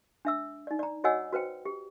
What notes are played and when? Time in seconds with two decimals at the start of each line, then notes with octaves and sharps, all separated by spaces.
0.25 D4 E5 E6
0.67 D#4 D5
0.79 D5 A#5
1.04 F#4 C#5 D#5 F#5 G#5 E6
1.33 F#4 B4 C5 G5
1.65 G4